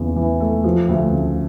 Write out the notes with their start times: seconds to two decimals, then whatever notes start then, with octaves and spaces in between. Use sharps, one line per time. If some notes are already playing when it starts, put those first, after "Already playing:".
Already playing: E2 C#3
0.16 E3
0.40 A3
0.64 F3
0.89 D2
1.12 C#3